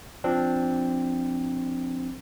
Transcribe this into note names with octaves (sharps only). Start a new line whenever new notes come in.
F3 C4 D4